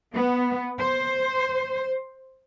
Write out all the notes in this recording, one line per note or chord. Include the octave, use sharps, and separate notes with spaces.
B3
C5